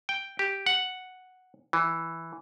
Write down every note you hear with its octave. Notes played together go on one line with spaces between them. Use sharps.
G5
G4
F#5
E3